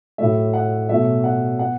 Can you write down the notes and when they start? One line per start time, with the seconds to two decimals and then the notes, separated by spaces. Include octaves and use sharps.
0.18 A2 F#3 A3 E5
0.53 F#5
0.89 B2 F#3 A3 E5
1.24 F#5
1.59 B3 F#5